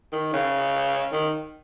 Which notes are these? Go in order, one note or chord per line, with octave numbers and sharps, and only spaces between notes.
D#3
C#3
D#3